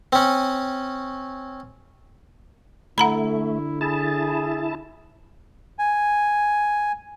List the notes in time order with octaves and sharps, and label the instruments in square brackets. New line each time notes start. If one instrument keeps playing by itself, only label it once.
[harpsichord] C4 C#4
[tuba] D3 [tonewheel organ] A3 [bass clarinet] E4 [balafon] F#5 A#5 B5
[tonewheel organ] E4 A5 [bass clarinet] G#4
[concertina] G#5